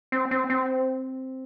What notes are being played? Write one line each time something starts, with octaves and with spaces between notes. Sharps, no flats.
C4
C4
C4